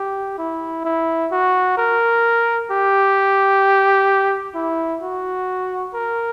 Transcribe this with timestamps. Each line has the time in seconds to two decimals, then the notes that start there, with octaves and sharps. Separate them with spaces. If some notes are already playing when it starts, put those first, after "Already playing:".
Already playing: G4
0.38 E4
0.85 E4
1.32 F#4
1.77 A#4
2.71 G4
4.55 E4
5.01 F#4
5.94 A#4